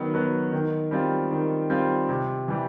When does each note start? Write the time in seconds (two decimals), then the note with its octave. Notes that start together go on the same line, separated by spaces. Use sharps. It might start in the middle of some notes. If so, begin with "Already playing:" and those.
Already playing: D#3 F#3 B3
0.14 F#3 B3
0.52 D#3
0.91 G3 C4 F4
1.31 D#3
1.70 G3 C4 F4
2.09 C3
2.48 E3 G3